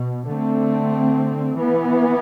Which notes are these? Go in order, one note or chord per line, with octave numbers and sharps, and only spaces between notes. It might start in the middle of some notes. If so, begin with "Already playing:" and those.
Already playing: B2
D3 A3 C4
E3 B3